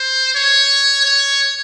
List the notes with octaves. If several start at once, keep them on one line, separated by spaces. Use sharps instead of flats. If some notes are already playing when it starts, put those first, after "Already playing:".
Already playing: C5
C#5
C#5